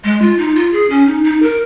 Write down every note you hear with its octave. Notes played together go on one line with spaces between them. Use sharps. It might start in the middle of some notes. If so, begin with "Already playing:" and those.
G#3
F4
D#4
F4
G#4
C#4
D#4
D#4
A#4